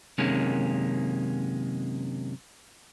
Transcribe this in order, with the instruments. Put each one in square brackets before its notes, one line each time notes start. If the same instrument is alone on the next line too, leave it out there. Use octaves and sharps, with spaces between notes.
[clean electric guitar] F#2 C3 D#3 G#3 A#3 C#4